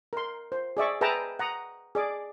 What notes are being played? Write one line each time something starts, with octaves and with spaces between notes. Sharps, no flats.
A#4 C6
C5
G#4 D5 E5 C#6
G#4 B4 E5 G5 A5 A#5
F#5 A#5 D#6
G#4 D5 D6